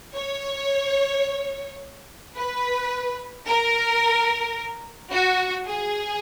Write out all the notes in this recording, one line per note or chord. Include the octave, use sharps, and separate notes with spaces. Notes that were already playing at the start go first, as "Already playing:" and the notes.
C#5
B4
A#4
F#4
G#4